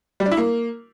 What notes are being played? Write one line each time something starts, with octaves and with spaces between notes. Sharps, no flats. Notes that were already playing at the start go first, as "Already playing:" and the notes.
G3
D4
E4
A#3